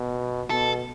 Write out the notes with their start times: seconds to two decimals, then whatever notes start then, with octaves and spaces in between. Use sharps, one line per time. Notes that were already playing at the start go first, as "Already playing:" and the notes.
Already playing: B2
0.50 B2 A4